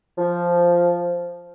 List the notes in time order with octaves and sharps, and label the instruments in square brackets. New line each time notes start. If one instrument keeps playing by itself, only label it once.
[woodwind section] F3